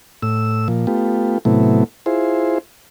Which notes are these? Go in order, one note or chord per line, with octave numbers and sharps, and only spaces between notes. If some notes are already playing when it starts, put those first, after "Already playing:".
A2 E6
A#2 F3
A3 B3 F4 G4
A2 C3 F#3 A3 B3 E4
E4 F4 G#4 C5